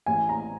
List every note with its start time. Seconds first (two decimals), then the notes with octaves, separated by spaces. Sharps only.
0.06 A1 G#5
0.29 A#5